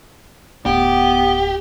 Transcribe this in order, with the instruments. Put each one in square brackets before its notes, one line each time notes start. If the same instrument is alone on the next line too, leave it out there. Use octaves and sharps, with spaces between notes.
[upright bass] D1 [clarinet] B3 [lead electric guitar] G4